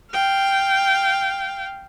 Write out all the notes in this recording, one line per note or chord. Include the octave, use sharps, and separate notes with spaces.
F5 G5